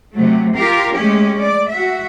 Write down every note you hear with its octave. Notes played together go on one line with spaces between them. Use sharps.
C3 F#3 A3
F4 G4 A#4 F5
G#3 A3 C#4 G4
D5
F#4 E5